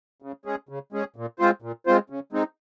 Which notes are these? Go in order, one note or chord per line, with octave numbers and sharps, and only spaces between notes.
C#3
G#3 C#4 G#4
C#3
G#3 C#4 G#4
A#2
G#3 C4 F4 C5
A#2
G#3 C4 F4 C5
C#3
G#3 C4 D#4